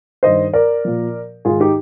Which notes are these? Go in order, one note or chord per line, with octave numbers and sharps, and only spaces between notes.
G2 D#3 C5 D#5
A#4 D5
A#2 F3
G#2 D#3 F4 G#4
D#4 G4